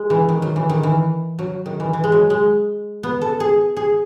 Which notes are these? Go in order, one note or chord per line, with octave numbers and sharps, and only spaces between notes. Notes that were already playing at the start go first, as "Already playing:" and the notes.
Already playing: G#3
E3
D#3
F#3
E3
D#3
E3
F#3
D#3
E3
E3
G#3
F#3
G#3
B3
A4
G#4
G#4